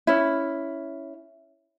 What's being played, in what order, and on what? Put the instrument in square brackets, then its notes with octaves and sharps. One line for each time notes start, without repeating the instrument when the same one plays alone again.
[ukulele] C#4 E4